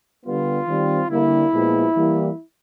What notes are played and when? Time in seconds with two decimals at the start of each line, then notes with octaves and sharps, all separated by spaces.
0.24 D3 G3 B3 F4
0.66 D#3 G3 C4
1.09 D3 G3 A#3 E4
1.51 A#2 F3 G#3 B3
1.94 E3 G3 A#3